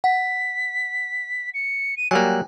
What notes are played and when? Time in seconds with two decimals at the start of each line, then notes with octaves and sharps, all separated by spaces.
0.04 F#5 B6
1.53 C#7
1.96 D#7
2.11 F#3 G3 A#3 G5 G#5 F#6